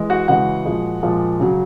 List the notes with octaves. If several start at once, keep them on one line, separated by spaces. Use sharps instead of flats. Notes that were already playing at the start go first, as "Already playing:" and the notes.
Already playing: E3 G#3
F#4 F#5
C#3 E3 G#3 F#4 F#5
A#2 F3 G#3
A#2 F3 G#3
C#3 F#3